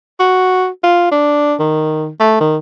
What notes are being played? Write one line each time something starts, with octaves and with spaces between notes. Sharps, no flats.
F#4
F4
D4
D#3
A3
D#3